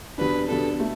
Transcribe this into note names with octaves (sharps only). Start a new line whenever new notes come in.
E2 B2 G3 D4 B4
E2 B2 G3 D4 A4
B2 A3